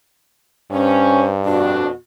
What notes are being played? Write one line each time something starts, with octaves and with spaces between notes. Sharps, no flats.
G2 C#4 C5
F2 B2 D4 F#4